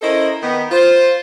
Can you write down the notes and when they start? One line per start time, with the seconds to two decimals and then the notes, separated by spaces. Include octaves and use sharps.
0.02 C#4 E4 A4 A#4 C5 D#5
0.42 D#3 B3
0.71 F4 C5